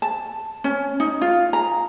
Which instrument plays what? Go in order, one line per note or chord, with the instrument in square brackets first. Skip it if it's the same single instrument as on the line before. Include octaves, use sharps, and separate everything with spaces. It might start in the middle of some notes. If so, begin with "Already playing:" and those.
[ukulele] A5
C#4
D#4
F4
A#5